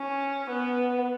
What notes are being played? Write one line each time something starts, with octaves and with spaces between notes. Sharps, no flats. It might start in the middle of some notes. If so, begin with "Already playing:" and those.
Already playing: C#4
B3